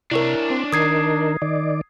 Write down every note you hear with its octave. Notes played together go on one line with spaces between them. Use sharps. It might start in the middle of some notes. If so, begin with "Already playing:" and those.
C3 D4 E4 A#4 C#5
C4
D#3 A#4 D#6 G#6 C7
D#3 D5